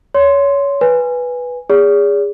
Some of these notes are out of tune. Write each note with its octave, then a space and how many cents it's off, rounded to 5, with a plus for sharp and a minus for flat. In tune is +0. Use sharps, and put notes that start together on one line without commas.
C#5 +20 C6 +0
B4 -5 G#5 -15
G#4 -25 D5 -45